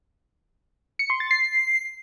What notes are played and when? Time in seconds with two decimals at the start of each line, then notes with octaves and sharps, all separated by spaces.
0.99 C#7
1.10 C6
1.20 A6
1.31 C7